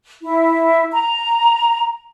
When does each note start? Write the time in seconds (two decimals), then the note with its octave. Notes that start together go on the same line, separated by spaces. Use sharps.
0.22 E4
0.92 A#5